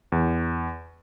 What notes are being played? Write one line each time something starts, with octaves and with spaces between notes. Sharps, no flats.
E2